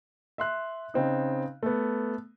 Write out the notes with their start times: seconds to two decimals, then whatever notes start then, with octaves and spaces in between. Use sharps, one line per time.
0.38 E5 C6 F#6
0.94 C#3 C4 D#4
1.63 A3 B3